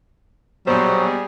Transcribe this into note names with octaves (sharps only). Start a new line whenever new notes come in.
A#1 B2 F#3 G3 G#4 C5